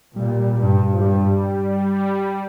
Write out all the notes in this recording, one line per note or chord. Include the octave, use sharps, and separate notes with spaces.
A#2 G3
G2
F3
G2 G3